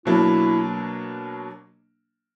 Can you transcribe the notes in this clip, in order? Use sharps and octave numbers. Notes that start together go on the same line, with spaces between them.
B2 F#3 A#3 D4 E4